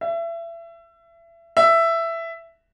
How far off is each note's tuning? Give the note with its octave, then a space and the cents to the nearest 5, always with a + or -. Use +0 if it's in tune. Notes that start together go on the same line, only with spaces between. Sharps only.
E5 +30
E5 +10